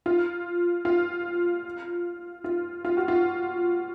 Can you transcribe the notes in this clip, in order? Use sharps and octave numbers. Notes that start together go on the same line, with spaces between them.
F4
F4
F4
F4
F#4
F4